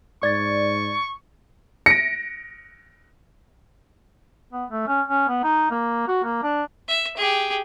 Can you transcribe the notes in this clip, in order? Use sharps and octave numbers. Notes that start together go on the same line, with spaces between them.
G#2 D5 C#6 G#6 A6
A#6 C#7 D7
B3
A3
C#4
C#4
B3
D#4
A#3
F#4
A#3
D4
E5
G4 G#4